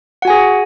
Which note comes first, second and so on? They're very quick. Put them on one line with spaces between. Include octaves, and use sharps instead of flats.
F#5 F#4 G#5 G#4